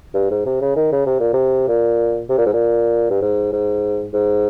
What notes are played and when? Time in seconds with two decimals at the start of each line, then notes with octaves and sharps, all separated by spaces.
0.14 G2
0.30 G#2
0.46 C3
0.61 C#3
0.76 D#3
0.92 C#3
1.06 C3
1.20 A#2
1.33 C3
1.68 A#2
2.29 C3
2.38 A#2
2.46 G#2
2.53 A#2
3.10 G2
3.21 G#2
3.52 G#2
4.13 G#2